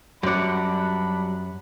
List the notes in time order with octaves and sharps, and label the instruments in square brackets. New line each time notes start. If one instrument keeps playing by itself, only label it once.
[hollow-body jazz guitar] F#2 D5 [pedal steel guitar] F#3 G3 F#5 [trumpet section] D4 B5